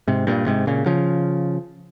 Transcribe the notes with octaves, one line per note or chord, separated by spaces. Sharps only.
G#2 C3
G2 A#2
G#2 C3
A#2 C#3
C#3 F3